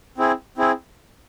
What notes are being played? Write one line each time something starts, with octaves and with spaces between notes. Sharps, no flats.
C4 E4 G#4
C4 E4 G#4